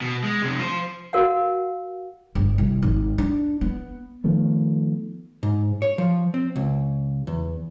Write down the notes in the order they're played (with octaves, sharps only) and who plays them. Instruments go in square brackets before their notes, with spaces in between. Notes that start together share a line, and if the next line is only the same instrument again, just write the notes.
[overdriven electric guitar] B2
G#3
F2 C3
F3 C5
[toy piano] F#4 A#4 F5 F#5
[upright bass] G1
C2
G#1
D4
B3
[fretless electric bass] D#3 F3 A3 B3
[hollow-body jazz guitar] G#2
C#5
F3
C4
C#2
E2